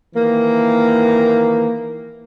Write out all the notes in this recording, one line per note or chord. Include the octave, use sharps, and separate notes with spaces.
D#3 E3 A#3